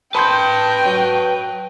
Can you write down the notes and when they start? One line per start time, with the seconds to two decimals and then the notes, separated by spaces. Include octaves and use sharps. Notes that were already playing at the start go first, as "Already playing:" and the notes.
0.15 B4 G5 A5 B5 C6 G6
0.85 F#3